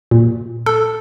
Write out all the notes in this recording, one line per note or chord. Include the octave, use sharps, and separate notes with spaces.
A#2
A4